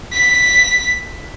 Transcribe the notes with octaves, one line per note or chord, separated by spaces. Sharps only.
B6